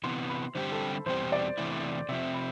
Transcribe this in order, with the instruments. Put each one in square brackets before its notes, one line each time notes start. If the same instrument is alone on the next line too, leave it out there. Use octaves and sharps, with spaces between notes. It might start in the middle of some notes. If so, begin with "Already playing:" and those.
[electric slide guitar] C3 E3 B3 [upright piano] C6
[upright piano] B5
[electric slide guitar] D3 G3 C4 G4 [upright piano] C5
[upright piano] A4
[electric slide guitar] E2 B2 G3 C4 G4 [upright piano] C5
[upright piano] D5
[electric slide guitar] E2 C3 E3 A3 E4
[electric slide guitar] C3 F3 C4 [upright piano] E5
[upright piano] B5